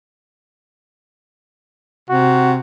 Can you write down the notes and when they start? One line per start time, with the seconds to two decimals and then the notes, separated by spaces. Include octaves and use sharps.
2.10 C3 F#4